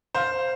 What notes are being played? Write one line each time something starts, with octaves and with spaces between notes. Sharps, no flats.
C5 F5